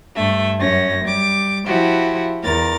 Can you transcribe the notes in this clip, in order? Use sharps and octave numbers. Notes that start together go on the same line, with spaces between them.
G2 A3 E5
F#2 C#4 A#6
G3 D6
F3 E4 F#4 G4
E2 A#4 A6